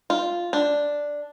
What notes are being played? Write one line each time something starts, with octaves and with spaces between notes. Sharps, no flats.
F4
D4